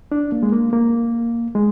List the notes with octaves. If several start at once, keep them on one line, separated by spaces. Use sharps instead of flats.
D4
A#3
G#3
A#3
A#3
G#3